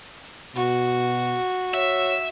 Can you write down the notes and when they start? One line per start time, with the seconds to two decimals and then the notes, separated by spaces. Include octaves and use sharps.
0.56 B2 F#4
1.74 C#5 E5